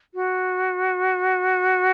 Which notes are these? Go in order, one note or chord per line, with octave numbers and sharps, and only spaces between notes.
F#4